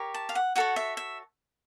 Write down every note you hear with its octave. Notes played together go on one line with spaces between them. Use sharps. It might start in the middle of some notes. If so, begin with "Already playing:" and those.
Already playing: G4 A#4 C#5
A5
F5
F#5
F#4 A4 C#5 F#5
E5
E5